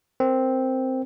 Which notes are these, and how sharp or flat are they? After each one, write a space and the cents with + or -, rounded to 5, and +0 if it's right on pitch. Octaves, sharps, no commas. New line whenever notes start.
C4 +0 A#4 +0